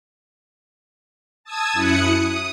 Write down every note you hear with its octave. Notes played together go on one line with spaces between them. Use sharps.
A5 D#6 E6 G#6
F#2 E4 D#6 F#6 C#7
D#6